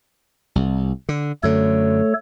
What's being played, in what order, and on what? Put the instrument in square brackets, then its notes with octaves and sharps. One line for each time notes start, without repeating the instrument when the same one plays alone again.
[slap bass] C2
D3
[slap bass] F#2 D3 [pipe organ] A3 A4 C#5